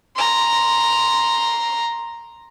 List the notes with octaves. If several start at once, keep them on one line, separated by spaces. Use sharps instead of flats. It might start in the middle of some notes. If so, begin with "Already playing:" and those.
A#5 C6